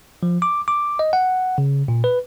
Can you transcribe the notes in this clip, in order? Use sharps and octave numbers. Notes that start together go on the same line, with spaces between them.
F3
D6
D6
D#5
F#5
C#3
A#2
B4